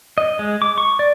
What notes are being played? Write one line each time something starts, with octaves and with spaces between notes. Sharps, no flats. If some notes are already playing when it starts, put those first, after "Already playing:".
D#5
G#3
D6
C#6
D5